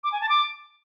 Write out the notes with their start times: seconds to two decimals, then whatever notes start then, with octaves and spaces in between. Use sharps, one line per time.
0.04 D6
0.12 G#5
0.21 A5
0.29 D6